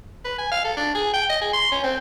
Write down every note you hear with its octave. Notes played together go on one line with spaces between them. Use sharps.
B4
G#5
F5
A4
D4
G#4
G5
D#5
G#4
C6
C#4
C4